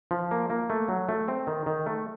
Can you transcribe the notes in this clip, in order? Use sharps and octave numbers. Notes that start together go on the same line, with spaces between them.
F3
A#3
A#3
A3
F#3
A3
C4
D#3
D#3
A3